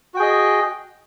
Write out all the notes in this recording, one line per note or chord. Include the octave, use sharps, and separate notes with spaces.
F#4 G#4 D#5 G5